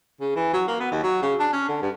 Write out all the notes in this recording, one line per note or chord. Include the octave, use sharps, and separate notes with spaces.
C#3
E3
F#3
A#3
B3
D#2
F#3
C#3
D4
C#4
D3
G2